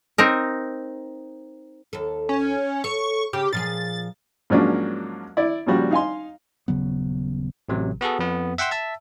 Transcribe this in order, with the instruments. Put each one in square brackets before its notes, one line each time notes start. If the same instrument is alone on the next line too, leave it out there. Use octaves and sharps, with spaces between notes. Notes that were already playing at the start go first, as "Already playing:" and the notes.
[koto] C4 D#4 A#4
[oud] D#2 A4
[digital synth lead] C#4
[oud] A4 C#5 [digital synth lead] C#6
[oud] C#3 [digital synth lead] G4
[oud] A#2 F3 G#4 [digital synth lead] A6
[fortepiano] G#2 F3 F#3 A#3 C#4 D4
E4 D5
A#2 C#3 F3 G3 F#4
D#4 F5 G#5 C6
[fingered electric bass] D#1 C#3 F#3 B3
[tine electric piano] A1 C3 F#3
B3 F#4 G#4 A4
F2 B3
E5 F#5 G5 C6 E6
E5 A5 E6